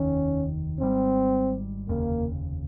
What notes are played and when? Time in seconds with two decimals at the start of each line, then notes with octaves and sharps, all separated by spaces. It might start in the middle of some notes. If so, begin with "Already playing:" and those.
Already playing: F1 D#2 D#3 C#4
0.79 G#1 G#2 G3 C4
1.89 F1 D#2 C#3 A#3